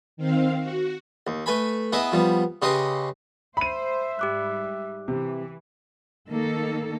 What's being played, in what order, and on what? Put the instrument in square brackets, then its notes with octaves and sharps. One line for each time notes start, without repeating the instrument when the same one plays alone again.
[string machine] D#3 C4 F5
F#4
[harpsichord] D#2
A3 B4 G#5 B5
B3 E4 G#4 B4 D#5 E5
F3 G3 B3
C#3 G4 B4 D#5 C6 D6
[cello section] C5 [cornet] E5 [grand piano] B5 D#7
[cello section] G#2 G3 [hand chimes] G4 D6 F#6
[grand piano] C3 [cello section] E3
[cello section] D#3 A#3 A4